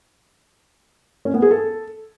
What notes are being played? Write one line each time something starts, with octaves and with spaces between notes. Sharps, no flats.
C#4
B3
G#4
A4